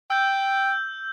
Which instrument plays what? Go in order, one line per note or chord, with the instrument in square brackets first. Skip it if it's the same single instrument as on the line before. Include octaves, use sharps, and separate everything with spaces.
[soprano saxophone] G5 [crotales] E6 G6